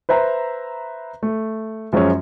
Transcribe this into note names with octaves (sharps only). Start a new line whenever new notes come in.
B4 C5 E5 A#5
A3
F#2 F3 F#3 G#3 C#4